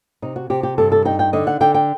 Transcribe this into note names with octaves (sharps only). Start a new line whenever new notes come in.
C3 D#4
F#4
C3 G4
G4
G2 A4
A4
D#4 G5
G5
D3 D#5
F#5
D3 G5
G5